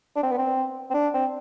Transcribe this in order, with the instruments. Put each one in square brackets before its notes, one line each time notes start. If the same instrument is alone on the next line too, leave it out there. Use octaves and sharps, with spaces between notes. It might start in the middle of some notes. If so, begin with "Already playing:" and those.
[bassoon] D4
C4
B3
C4
C4
D4
C4